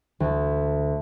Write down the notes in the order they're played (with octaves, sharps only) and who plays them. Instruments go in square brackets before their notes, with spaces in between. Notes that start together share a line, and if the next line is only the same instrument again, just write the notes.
[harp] D2